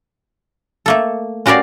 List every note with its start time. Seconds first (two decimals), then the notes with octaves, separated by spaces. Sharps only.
0.86 A3 A#3 A4
1.46 C#4 F#4 G4 A#4 D5 F5